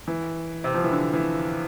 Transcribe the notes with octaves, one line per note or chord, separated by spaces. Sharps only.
E3
C3
F3
E3
D3
E3